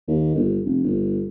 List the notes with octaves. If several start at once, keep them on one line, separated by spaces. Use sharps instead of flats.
D#2
G1
F1
G1